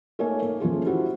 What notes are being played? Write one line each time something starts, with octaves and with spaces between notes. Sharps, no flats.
A3 A#3 D#4 A#4 C#5 G#5
A#3
F3 A3 C#4 F4 G#4
E4 F#4 G4 C5